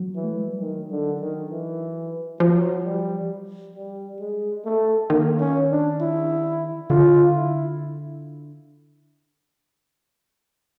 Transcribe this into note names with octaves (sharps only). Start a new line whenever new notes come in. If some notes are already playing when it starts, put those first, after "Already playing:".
Already playing: F#3
E3
A3
G#3
G3
D#3 F#3
D3
D#3
E3
F3 F#3
G3
G3
G#3
A3
D#3 A#3
C#4
D4
E4
D3 F4
E4